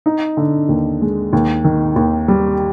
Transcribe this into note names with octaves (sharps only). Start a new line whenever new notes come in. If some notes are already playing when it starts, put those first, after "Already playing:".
D#4
D3
D#2
G#3
D#2
D#3
D#2
G3